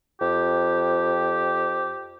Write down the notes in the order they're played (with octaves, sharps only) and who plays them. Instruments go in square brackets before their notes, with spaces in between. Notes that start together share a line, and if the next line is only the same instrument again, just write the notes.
[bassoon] F2 [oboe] G4